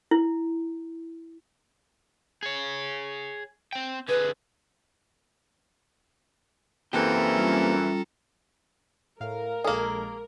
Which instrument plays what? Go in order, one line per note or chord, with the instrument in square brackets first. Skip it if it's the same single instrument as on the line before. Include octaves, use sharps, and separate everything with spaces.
[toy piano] E4
[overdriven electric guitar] G#4 C#5
C4 G5
[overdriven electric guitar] D3 G#4 [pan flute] B4
[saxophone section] F#2 E3 [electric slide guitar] A#3 C4 G4 [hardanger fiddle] A4 A#5
[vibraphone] G3 C#4 F4
[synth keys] A2 F5 [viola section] A#4
[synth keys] A#1 G#3 A4 [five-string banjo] A#3 G#4